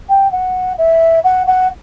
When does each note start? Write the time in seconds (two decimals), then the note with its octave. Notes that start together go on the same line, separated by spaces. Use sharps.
0.09 G5
0.32 F#5
0.78 E5
1.24 F#5
1.47 F#5